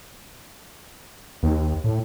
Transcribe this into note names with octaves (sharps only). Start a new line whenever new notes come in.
D#2
A2